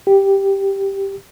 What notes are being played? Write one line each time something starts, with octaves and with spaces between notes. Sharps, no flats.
G4